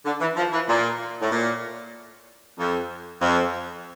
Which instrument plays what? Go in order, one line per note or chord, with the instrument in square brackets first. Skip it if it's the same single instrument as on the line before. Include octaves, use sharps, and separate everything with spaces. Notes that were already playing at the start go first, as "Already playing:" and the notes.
[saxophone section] D3
E3
F3
E3
A#2
A2
A#2
F2
F2